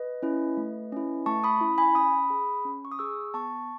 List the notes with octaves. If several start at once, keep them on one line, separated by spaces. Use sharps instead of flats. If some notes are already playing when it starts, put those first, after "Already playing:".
Already playing: B4 D#5
C#4 E4
A3
C#4 E4
A3 A5 C#6
B5 D#6
C#4 E4
G#5 B5
C#4 B5 D#6
G#4
C#4
C#6
D#6
G#4 C#6 E6
B3 A5 C#6